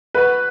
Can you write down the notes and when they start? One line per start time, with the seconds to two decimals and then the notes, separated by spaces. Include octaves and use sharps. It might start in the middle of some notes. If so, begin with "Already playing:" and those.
0.14 B3 D#4 F#4 B4